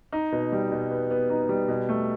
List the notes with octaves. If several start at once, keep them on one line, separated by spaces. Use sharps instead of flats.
D#4
B2
G3
B2
B3
B3
D#4
G3
B2
A3